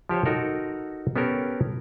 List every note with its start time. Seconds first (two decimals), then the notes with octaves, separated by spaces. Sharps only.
0.09 F3 G4 C5 C#5
0.25 D#4 F#4 A4 A#4
1.16 B3 C#4 G4 A4 A#4